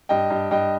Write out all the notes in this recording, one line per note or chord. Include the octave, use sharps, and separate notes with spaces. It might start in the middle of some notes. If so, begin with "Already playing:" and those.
G2 D#5 G5
G2
G2 D#5 G5